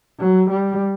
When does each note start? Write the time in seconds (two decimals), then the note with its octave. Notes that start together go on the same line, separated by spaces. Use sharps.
0.20 F#3
0.50 G3